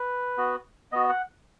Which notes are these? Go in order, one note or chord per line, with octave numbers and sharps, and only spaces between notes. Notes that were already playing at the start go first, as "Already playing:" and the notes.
Already playing: B4
B3 F#4
B3 F#4 D#5
F#5